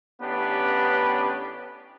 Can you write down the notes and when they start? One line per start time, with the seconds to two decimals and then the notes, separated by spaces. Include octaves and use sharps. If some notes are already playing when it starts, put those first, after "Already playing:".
0.22 A1 B3 C#4 D4 G4 B4